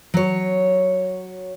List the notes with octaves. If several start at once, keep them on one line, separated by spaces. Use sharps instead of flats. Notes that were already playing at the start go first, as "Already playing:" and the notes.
F#3 C#5